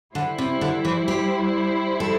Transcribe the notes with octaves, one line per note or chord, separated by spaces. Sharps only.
D3 G3 E4 C5
C3
D3
E3
G4
A4